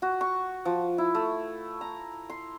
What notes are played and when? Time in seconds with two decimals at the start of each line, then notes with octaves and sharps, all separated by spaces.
0.02 F#4
0.21 C#6
0.65 F3
0.98 E4
1.15 A3
1.81 A#5
2.30 C6